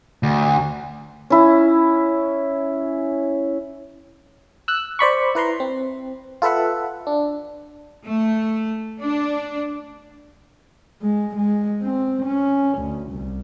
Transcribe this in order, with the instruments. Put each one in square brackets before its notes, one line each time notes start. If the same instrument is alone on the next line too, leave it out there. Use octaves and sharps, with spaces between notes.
[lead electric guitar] D2
[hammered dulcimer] C#4 E4
[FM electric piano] E6 F#6
C5 D5 B5 C#6
E4 B4 A#5 C6
C4
F4 A4 B4 E5 F#5
D4
[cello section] A3
D4
[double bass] G#3
G#3
C4
C#4
D2
C2